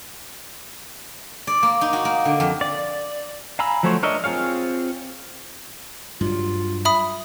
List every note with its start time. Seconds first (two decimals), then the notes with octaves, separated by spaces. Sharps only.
1.47 D5
1.63 A#3
1.81 D#4
1.93 F#4
2.05 A#3
2.25 D3
2.40 F2
2.61 D5
3.59 F5 G#5 A#5 B5 E6
3.83 F3 F#3 A3 C5 C#5
4.03 D4 A#4 C#5 D#5 E5
4.24 C4 F4 G#4 C#5 F5
6.21 G2 F#3 F4
6.85 E5 B5 D#6